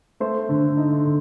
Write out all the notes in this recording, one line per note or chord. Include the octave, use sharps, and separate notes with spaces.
A3 C5
D3
D#4
D3